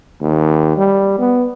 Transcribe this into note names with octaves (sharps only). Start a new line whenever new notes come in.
D#2
G3
B3